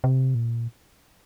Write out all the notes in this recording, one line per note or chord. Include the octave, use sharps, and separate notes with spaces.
C3
A#2